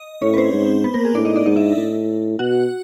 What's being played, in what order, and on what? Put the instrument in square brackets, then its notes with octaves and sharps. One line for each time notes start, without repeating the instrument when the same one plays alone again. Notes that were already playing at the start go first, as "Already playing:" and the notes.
Already playing: [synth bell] D#5
[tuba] A2 [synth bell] C#4 C#5
[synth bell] B4
C4 C5
[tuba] G#2
[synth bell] B3 B4
A#3 A#4
G#4
[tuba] A2 [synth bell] D4 D5
[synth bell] D#4 D#5
D4 D5
[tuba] G#2 [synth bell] D#4 D#5
[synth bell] E4 E5
[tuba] A2
[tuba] B2 [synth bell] F#4 F#5